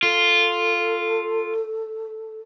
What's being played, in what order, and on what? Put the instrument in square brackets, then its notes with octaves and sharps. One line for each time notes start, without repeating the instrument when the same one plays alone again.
[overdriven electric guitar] F4 [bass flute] A4